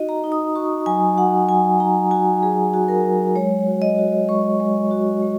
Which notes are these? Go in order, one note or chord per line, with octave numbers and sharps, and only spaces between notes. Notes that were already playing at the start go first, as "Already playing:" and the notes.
Already playing: D#4 F#4 D#5
A#5
D#4
D#6
F#4 C#6
F#3 G#5
F#4 F#5
F#3 G#5
D#4 A#5
F#4 G#5
F#3 G#4
F#4
A#4
F#3
G#3 C#5
F#4
D#5
F#4
G#3 C#6
G#3
F#4
G#3